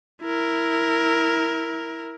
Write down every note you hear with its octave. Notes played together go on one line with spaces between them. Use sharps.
E4 A#4